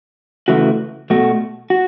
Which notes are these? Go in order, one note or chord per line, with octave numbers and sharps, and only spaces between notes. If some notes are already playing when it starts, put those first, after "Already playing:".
C#3 E3 A3 F#4
B2 A3 F#4
F#4